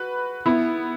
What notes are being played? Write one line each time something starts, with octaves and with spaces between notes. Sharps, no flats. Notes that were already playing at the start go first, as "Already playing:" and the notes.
Already playing: F#4 B4
B3 E4